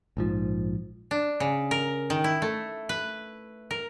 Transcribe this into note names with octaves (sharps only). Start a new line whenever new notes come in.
A#1 G#2 F3
D4
C#3
A#4
D#3
E4
A3
B4
A#4